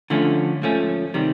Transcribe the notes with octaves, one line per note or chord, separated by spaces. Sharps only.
D3 F3 A3 C#4
G#2 F3 A3 C#4
C3 D#3 G3